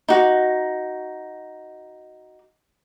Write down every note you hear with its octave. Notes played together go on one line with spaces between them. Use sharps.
D#4 F#4